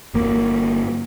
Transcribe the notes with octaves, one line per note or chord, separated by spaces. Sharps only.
G1 A#3